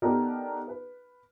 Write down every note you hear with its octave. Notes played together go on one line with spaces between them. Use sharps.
B3 D4 D#4 G4 A4 A#4
B4